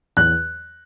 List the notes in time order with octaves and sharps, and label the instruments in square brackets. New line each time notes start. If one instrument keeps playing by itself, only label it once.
[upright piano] E2 F#6